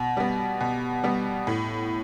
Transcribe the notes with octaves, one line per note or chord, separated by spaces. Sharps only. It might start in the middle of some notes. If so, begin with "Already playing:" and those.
Already playing: B2
G3 B3
B2
G3 B3
A2